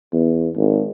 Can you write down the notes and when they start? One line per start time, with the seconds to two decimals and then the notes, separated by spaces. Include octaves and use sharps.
0.13 E2
0.56 G#1